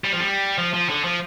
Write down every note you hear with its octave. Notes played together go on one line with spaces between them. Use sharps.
G3
F3
G3
F3
F3
D3
F3